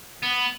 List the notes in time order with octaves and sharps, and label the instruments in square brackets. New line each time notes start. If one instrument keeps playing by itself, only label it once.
[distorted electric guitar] B3